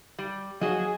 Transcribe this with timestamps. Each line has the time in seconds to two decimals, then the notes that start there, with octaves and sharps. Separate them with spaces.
0.19 G3
0.61 F3 F#3 F#4 G#4 D#5 F5